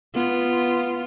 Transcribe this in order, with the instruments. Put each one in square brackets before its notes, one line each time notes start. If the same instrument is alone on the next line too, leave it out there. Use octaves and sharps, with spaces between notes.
[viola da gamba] B3 F4